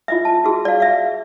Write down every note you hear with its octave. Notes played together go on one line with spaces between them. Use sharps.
F4 D#5 E5
A5
F#4 G#4
D5 F5
E5 F5